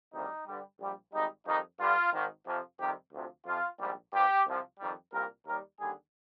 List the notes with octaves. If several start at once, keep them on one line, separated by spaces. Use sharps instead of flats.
D2 C3 D#3 G3 D#4
G2 D3 G3
A#1 A#2 G3
G#1 G#2 G3 D#4
F2 D#3 G3 D#4
G2 D3 G3 F4
G#1 G#2 D#3
F2 C3 F3
F2 C3 D#3 G3 G4
D2 C3 F3
F2 C3 F3 F4
A#1 G#2 G3
G2 F3 G4
C2 C3 F3
F2 D#3 G3
C2 A#2 G3 A#4
D#2 D#3 G3 A#4
D#2 D3 G3 G#4